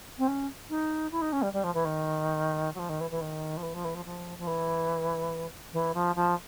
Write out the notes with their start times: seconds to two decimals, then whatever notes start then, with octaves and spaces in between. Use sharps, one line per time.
0.18 C4
0.27 C#4
0.69 D#4
1.11 E4
1.21 D#4
1.32 C#4
1.42 G3
1.53 G3
1.63 F3
1.74 E3
1.84 D#3
2.74 F#3
2.78 F3
2.89 D#3
3.00 E3
3.10 E3
3.21 D#3
3.57 F3
3.62 E3
3.74 F3
3.84 E3
3.94 F3
4.05 F3
4.38 F3
4.47 E3
5.73 E3
5.94 F3
6.15 F3